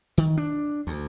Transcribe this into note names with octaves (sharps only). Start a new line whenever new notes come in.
D#3
D4
D2